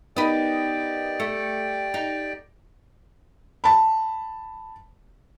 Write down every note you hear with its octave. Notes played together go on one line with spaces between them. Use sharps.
B3 D#4 G4 A#4 B4 D5 D#5 G5
A3 C#7
D#4
A5 B5